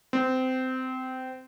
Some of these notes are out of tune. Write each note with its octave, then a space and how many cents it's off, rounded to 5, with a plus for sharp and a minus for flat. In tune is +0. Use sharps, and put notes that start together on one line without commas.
C4 -20